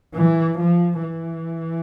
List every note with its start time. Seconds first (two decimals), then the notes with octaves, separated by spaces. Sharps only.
0.15 E3
0.59 F3
1.02 E3